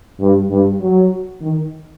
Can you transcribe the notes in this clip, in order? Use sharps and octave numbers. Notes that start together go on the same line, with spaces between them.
G2
G2
F#3
D#3